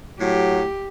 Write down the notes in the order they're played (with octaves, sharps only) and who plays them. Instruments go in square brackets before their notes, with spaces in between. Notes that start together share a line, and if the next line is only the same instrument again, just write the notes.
[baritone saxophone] A2 [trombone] F#3 [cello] G4